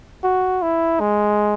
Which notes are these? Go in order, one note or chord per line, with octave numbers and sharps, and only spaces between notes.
F#4
E4
G#3